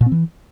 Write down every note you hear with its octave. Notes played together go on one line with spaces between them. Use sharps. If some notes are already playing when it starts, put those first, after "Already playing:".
A#2
C4
E3